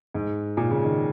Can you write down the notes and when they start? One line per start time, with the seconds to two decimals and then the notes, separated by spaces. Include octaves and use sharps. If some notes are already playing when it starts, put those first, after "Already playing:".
0.14 G#2
0.57 A#2
0.71 C#3
0.84 D#3